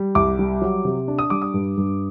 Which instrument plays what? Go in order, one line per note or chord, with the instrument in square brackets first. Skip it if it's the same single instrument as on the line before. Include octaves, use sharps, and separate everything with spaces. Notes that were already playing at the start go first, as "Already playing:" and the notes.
Already playing: [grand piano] G3
C2 D6
G3
F#3
C3
D4
D#6
G3 D6
D#6
G2
G2